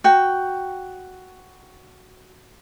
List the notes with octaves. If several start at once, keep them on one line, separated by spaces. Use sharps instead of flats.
F#4 G5